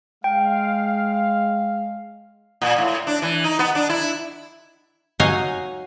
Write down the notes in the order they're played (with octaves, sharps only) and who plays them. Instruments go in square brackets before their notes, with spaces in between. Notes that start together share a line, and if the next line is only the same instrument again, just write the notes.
[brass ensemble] G#3 F5 [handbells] G5
[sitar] A#2
A2
D4
E3
D#4
B3
D4
E4
[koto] F#3 D#4 D#5 F5 G#5